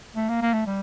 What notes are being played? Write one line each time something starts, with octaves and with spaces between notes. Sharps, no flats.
A3
A#3
A#3
A3
G3